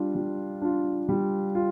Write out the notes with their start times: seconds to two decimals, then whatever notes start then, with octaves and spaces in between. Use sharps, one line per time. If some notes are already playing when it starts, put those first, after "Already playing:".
Already playing: G3 D4 F4
0.15 G3
0.61 D4 F4
1.09 G3
1.55 F4